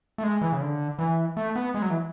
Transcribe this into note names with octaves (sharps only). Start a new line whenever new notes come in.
A3
G#3
E3
C#3
D3
E3
A3
B3
G#3
F#3
E3